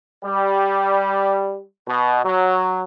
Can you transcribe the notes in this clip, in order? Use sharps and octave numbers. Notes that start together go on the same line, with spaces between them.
G3
B2
F#3